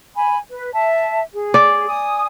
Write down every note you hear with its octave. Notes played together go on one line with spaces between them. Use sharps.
G#5 B5
B4
E5 A5
G#4
D5
G#5 D#6